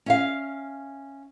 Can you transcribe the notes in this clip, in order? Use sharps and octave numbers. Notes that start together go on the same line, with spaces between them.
C#4 E5 F5